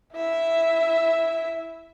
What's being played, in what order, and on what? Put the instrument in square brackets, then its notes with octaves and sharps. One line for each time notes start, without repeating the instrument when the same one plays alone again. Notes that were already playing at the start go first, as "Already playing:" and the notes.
[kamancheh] E4 E5